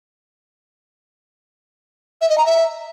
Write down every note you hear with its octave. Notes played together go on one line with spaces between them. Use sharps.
E5
D#5
A#5
E5